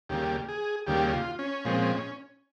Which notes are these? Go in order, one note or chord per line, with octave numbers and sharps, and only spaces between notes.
D#2 C#3 G3 A#3 G4
G#4
D#2 C#3 G3 A#3 G4
F4
C#4
A#2 F3 G#3 C4